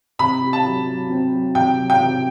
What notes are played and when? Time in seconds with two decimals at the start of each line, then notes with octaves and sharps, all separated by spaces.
0.19 C3 B5
0.42 G4
0.53 A5
0.65 F#3
0.87 F#3
1.10 C4
1.32 F#3
1.55 C3 G5
1.78 F#3
1.90 G5
2.00 C3